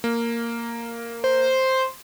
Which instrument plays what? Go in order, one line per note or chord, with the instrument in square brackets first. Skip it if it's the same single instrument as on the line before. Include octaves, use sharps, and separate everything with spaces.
[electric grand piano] A#3
[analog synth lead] C5